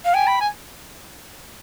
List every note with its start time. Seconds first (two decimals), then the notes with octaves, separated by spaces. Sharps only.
0.05 F5
0.14 G5 G#5
0.27 B5
0.41 G#5